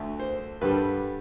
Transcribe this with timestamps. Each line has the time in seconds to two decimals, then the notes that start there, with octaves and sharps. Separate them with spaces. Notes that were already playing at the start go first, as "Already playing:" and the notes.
Already playing: D2 D3 A3
0.19 C5
0.61 G2 D3 G3 B4